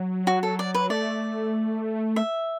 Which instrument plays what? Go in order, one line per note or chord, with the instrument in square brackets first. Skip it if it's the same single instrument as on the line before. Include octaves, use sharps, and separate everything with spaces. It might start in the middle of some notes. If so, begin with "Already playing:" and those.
Already playing: [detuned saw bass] F#3
[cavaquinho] F#4
A4
D5
B4
[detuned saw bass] A3 [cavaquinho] D5
[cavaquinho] E5